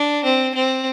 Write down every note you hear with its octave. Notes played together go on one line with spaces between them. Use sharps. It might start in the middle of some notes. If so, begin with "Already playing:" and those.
Already playing: D4
C4
C4